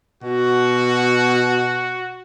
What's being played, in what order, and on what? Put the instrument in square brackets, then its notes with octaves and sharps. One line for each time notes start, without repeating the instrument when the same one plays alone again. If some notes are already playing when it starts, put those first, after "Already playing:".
[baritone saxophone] B2 [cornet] F#4